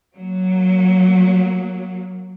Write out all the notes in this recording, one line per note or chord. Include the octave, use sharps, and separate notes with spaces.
F#3 A#3